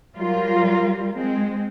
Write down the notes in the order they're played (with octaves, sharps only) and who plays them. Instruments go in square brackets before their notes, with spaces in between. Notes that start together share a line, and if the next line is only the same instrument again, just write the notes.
[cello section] F#3 G3 F4 A#4
G#3 C4